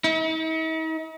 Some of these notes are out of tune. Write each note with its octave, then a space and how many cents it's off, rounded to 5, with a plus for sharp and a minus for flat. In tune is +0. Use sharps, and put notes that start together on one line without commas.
D#4 +45